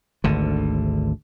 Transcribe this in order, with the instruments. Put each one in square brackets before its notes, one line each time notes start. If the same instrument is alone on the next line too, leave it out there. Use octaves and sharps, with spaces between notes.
[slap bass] G#1 D2 D3